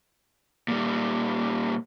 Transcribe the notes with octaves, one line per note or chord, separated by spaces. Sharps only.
A#2 G3